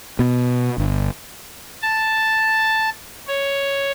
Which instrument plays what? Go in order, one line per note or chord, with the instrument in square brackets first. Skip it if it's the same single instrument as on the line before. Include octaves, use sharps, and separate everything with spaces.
[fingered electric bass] B2
G1
[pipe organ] A5
C#5